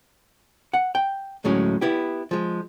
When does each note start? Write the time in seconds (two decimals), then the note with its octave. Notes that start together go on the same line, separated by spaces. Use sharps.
0.74 F#5
0.95 G5
1.44 D2 A2 F#3 G#3 C#4
1.81 B3 E4 G4
2.31 F3 G#3